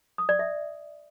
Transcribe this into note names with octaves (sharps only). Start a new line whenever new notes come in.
D#6
D5
E5